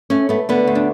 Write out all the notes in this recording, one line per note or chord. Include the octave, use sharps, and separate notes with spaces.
A3 C#4
A3 B3
D3 B3
D2
D4